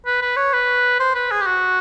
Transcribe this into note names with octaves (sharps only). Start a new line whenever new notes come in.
B4
B4
C#5
B4
C5
B4
G#4
G4
F#4